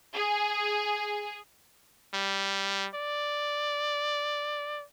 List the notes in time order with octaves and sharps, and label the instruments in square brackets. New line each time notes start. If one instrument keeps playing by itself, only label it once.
[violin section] G#4
[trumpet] G3
D5